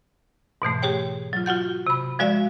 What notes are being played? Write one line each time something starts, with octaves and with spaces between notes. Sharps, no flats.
G#2 B2 E3 A3
G4 G#4 C#5 G5
F#3 F4
F4 F#4 F#5 G6
C3 B5
F3 G#3 F#4 D5 E5 F5